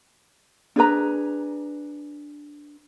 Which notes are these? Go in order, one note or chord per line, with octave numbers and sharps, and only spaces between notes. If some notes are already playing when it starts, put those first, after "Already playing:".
D4 G#4 B4 A#5